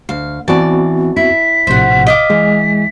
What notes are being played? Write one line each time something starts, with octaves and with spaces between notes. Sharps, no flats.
D2 F5
E3 B3 C4 F#4 D5 A5
E4 B6
A#1 A2 C3 C5 F#5
D#5 F5 D6 B6
E3 G#3